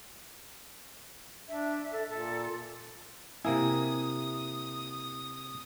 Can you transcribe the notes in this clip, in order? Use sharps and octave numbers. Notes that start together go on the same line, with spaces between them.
D4 E5
A4
A#2 A4
C3 A#3 E4 G#5 D#6